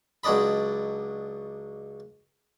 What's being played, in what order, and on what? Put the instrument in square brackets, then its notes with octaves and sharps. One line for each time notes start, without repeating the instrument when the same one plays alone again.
[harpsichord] C#2 F#3 D4 D5 D#5 B5